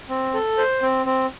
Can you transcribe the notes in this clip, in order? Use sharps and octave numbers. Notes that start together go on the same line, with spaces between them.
C4
A4
C5
C4
C4